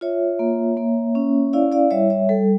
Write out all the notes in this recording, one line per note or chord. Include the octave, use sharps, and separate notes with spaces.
F4 C#5 E5
A#3
A#3
C#4
E4 D5 F5
D5 F5
G3 C#5 E5
C#5 E5
G3 A4